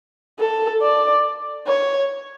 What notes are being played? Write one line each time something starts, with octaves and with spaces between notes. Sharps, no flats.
A4
D5
C#5